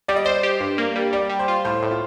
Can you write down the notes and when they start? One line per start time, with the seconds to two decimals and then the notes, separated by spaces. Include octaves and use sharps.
0.08 G3 D5
0.16 D#5
0.25 C5 D5
0.43 G4
0.60 G2
0.78 A#3
0.96 G3
1.13 G3 D5
1.30 G3
1.39 C5
1.48 F4
1.65 A2 C5
1.83 A2
1.91 F4